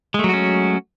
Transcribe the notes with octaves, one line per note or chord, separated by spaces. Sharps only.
F#3 G#3 A3 C#4 F#4